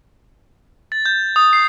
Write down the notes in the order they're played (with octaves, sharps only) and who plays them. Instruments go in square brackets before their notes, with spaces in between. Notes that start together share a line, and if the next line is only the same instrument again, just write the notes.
[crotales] A6
G6
D#6
C7